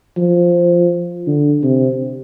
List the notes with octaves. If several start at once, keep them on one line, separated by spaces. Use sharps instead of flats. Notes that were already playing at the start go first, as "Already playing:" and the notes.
F3
D3
C3